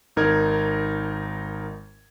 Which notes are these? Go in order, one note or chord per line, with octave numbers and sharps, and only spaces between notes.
G#1 D#4 A#4 G#6